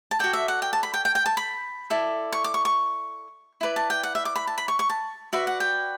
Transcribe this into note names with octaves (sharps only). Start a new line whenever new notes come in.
A5
F#4 A4 D5 G5
E5
F#5
G5
A5
B5
G5
G5
G5
A5
B5
E4 A4 D5
C#6
D6
C#6
C#6
E4 B4 D5
A5
G5
F#5
E5
D6
B5
A5
B5
C#6
C#6
A5
F#4 B4 D5 E5
F#5
G5